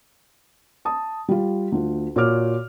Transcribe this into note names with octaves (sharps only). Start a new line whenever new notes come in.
A5 D#6
G3 F4
D2 F4
A#2 F#4 C#5 D6 F6